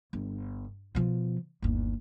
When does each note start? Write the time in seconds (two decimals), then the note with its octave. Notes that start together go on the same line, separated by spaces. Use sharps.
0.13 G1
0.95 B2 F3
1.62 G1 D#2